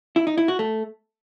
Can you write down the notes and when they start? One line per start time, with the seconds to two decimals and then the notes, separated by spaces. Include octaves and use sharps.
0.16 E4
0.27 D#4
0.38 E4
0.48 F#4
0.59 A3